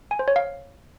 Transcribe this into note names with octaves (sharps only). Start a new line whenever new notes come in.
G#5
C5
C#5
F5